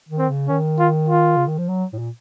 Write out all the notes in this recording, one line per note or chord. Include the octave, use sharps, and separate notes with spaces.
D#3
C4
C#3
D#3 C#4
F4
F4
C#3
D#3
F3
F#3
A2
A#2